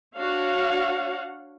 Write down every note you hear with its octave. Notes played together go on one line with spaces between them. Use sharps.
D4 F#4 C#5 F5 F#5